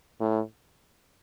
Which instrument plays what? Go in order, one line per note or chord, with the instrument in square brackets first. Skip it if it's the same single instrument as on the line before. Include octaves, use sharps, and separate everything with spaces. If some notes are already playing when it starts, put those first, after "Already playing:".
[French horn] A2